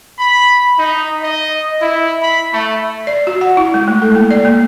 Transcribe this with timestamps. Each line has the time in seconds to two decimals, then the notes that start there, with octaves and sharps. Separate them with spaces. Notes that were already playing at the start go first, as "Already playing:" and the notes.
0.19 B5
0.79 D#4
1.23 D#5
1.81 E4
2.23 B5
2.53 A3
3.07 D5
3.27 F#4
3.41 F#5
3.57 E4
3.74 G#3
3.88 A3
4.02 A4
4.15 A#3
4.31 D5
4.45 A#3